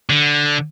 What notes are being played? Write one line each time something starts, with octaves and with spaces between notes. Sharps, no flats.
D3